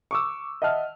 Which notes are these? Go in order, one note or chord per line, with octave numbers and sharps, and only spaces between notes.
C#6 D6 E6
D#5 E5 F#5 A5 F6